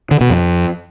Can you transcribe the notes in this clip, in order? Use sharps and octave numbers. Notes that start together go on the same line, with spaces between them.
D3
B2
F2